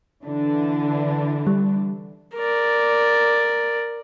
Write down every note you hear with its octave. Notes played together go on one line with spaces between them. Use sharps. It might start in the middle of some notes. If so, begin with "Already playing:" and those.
D3 E3 D4
G3
A#4 D5